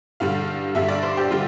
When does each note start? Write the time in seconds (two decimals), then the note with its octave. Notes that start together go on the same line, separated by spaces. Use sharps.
0.20 G2 D3 G3 F5
0.75 G2 D3 G3 E5
0.89 D5
1.03 C5
1.17 G4
1.31 D3 G3 F4